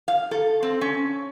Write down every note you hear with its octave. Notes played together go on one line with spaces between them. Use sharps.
F5
A4
C4
C#4